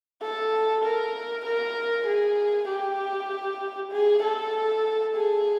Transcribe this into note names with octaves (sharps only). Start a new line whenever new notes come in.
A4
A#4
A#4
G#4
G4
G#4
A4
G#4